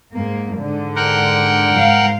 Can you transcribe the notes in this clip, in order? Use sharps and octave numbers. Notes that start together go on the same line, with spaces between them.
G#2 A#3
G#2 D3
A#4 F#5 G5
G#2 F5